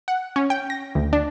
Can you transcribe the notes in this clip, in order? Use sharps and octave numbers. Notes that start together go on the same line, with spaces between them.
F#5
C#4
G5
A#6
D2
D4